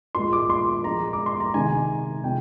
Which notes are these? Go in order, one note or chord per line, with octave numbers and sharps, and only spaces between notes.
A#2 G#3 C6
D6
C6
A#2 F3 G#3 A#5
D6
C6
A#5
C3 D#3 G#3 G#5
C3 F3 G#3 G5